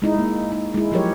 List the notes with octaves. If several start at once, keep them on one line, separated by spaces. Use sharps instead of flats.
G#3 D#4 E4
G#3 A#3
D#4
G#3 E4
F3 F#3 G4 A#4 C#5